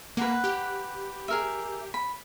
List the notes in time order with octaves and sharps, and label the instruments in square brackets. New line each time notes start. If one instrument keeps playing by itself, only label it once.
[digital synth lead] A#3 [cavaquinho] B4 F#5
[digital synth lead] G4
[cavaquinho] G#4 A#4 E5
B5